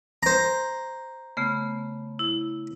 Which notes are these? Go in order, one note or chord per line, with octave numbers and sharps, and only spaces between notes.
C5 A#5
C#3 A3 B3
E4